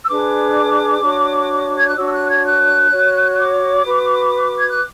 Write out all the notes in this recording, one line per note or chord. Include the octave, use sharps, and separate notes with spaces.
E6
D4 G#4 B4 D6
D4 F#4 C#5
G#6
F#6
D4 F#4 C#5 E6
E6
F#6
G#6
F#6
F#4 C#5
D6
F#4 B4
G#6
F#6